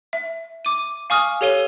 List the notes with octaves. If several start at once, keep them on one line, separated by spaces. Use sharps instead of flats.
E5
D6 D#7
F5 G#5 C#6 D#6 F6
G4 A4 C#5 F5 D#7 G7